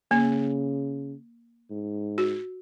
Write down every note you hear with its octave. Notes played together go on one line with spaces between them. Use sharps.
C#3 A#3
G#2
F#4